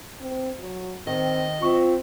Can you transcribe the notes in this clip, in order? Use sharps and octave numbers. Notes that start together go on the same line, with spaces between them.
C4
F#3
D#3 C4 D#5
C4 F4 E5 C#6